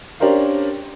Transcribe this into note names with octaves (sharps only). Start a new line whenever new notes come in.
C#4 D4 G4 A#4 C5 F5